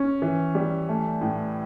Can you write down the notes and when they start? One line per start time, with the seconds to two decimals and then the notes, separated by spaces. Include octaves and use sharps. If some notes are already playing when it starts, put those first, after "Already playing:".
Already playing: C#4
0.22 E3
0.55 G3
0.89 A3
1.21 A2